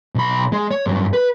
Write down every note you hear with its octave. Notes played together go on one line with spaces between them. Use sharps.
B1 B5
G#3
C#5
G2 F#3
B4